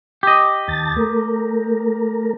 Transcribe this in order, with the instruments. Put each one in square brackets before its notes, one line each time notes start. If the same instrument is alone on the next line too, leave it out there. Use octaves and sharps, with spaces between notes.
[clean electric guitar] G4 D#5
[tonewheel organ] D#2 A5 A6
A3 A#4